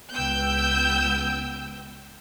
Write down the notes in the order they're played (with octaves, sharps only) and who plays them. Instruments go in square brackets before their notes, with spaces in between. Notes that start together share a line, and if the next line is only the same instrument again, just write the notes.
[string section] C#2 B3 G5 E6 G6